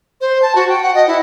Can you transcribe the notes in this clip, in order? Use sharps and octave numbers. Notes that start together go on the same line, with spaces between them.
C5
A5
F#4
G5
F#5
D#5
E4